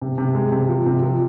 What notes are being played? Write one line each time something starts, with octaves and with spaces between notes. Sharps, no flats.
C3
C3
G#3
C3
F3
C3
F3